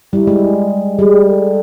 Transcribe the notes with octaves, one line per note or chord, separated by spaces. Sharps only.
G3 E4
G#3
G3 G#4
A4